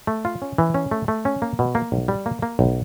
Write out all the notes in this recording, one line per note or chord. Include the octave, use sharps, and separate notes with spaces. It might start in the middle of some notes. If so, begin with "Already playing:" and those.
A3
F4
C#4
E3
C#4
A3
A3
C#4
A#3
B2
A#3
B1
G3
A#3
A#3
B1